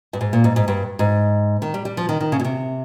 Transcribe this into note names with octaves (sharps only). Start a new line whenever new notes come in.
G2
G#2
A#2
G#2
G#2
G2
G#2
D#3
G3
G3
F3
D#3
D#3
C#3
A#2
C3